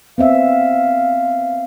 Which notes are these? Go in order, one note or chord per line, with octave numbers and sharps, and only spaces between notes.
B3 C4 E5 F5